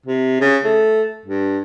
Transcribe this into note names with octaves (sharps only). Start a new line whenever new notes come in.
C3
C#3
A3
G2